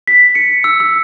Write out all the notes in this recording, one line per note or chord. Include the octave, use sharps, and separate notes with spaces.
B6
C#7
E6
E6